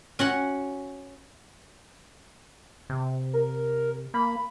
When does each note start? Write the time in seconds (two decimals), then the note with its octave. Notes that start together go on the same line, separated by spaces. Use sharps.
0.19 C#4 F#4 F#5
2.90 C3
3.33 A#4
4.14 A#3 B5